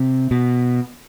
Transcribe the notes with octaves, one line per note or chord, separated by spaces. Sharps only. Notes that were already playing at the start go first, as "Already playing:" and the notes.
Already playing: C3
B2